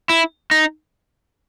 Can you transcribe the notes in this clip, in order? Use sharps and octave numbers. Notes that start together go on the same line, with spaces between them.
E4
D#4